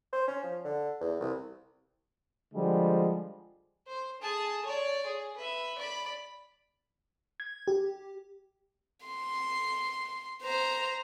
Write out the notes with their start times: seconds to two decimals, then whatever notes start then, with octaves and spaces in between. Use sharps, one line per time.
0.12 C5
0.28 C#4
0.43 F3
0.65 D3
1.01 E2
1.20 C2
2.54 D3 F3 G3 G#3
3.87 C5
4.22 G#4 A5
4.65 C#5 D5
5.06 G#4
5.37 B4 E5
5.79 D5 B5
7.40 G#6
7.68 G4
9.07 C6
10.43 C5 A#5